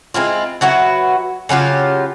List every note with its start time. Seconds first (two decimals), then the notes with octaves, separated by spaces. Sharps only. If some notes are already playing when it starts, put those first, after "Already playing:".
0.14 G#3 C4 E4 F4
0.61 F#3 E4 F#4 B4
1.49 C#3 F#3 F4 G4